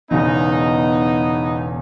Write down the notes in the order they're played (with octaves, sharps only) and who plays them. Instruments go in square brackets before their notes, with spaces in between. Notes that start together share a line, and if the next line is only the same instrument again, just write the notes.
[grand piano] E1 E2 C#3 [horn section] B3 D#4